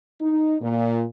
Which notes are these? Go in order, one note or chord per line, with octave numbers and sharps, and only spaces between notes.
D#4
A#2